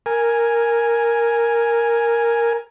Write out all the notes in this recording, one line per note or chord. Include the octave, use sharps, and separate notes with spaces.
A#4 G#5